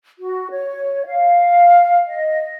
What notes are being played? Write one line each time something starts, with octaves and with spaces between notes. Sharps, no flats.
F#4
C#5
F5
D#5